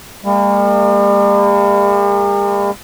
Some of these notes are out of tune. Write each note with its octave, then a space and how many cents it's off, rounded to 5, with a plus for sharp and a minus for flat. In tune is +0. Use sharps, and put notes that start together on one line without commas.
G3 +45 A#3 -30